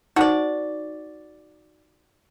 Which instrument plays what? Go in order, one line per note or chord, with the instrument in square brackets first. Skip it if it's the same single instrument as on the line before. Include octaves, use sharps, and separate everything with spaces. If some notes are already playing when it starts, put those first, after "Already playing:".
[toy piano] D#4 C5 [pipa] F#4 D5